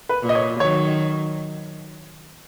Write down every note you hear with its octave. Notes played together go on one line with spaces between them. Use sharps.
B4
A#2
D#5
C#5
D#3 F#3 C#5